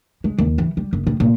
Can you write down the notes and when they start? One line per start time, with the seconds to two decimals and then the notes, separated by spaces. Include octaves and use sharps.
0.24 G#3
0.38 D#2
0.58 E3
0.77 G3
0.93 F#1
1.07 A2
1.20 A#2